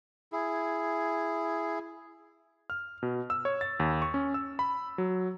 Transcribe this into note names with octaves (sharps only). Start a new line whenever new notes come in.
E4 G#4
F6
B2
E6
C#5
A6
D#2
C#6
C#4
E6
B5
F#3